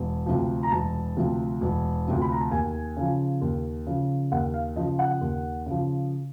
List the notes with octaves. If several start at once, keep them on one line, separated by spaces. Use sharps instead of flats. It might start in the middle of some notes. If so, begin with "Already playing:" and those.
Already playing: E1
D2 C3 F3
A#5
E1 A5
D2 C3 F3
E1
D2 C3 F3
B5
A#5
A5
D#2 G#5
C#3 F3
D#2
C#3 F3
D#2 F#5
F5
C#3 F3 D#5
F#5
D#2
C#3 F3